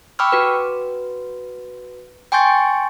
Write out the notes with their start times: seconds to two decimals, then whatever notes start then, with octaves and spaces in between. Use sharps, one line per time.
0.19 G5 B5 C#6 D6 E6 F6
0.32 F#4 B4
2.32 G5 G#5 C6 C#6 G6 A6